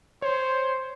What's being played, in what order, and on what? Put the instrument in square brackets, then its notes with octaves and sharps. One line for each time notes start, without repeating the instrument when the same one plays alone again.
[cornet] C5 [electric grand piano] C#5